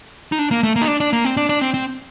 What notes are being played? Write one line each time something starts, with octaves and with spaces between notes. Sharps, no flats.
D#4
D4
A#3
A3
A#3
D#4
D4
D4
A#3
C4
D4
D4
C4
C4